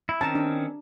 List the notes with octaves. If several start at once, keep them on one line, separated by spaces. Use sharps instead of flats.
E4
D#3 C4 C#4 A5 A#5
D4